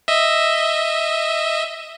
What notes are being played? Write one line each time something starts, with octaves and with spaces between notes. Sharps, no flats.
D#5 E5